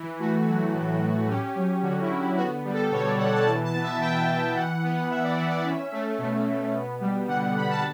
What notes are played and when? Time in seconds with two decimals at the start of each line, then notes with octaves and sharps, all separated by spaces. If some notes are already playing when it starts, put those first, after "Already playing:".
Already playing: E3
0.19 A3 F#4
0.47 F#3
0.74 A2
1.01 A2
1.28 C#4 G4
1.55 F#3
1.83 D3 F#4
2.01 E4
2.10 D3
2.19 E4
2.37 B3 F#4
2.65 G3
2.74 A4
2.91 B2 C#5
3.05 D5
3.18 B2 F#5
3.33 A5
3.46 E3 A5
3.64 A5
3.74 B3
3.83 E5
4.01 B3 G5
4.28 E3
4.55 E3 F#5
4.83 B3
5.10 B3 E5
5.23 D5
5.37 E3 E5
5.51 D5
5.64 C#4 E5
5.92 A3
6.18 B2
6.46 B2
6.73 B3
7.01 G3
7.27 D3 F#5
7.55 D3 B5
7.70 A5